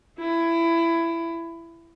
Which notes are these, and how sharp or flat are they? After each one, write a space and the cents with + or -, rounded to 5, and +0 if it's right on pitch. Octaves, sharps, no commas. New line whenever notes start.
E4 +20